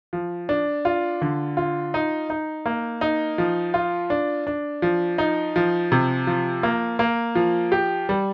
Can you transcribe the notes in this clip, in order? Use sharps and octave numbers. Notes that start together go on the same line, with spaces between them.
F3
D4
F4
D3
F4
D#4
D#4
A#3
D#4
F3
F4
D4
D4
F3
D#4
F3
C3
F3
A#3
A#3
F3
G4
G3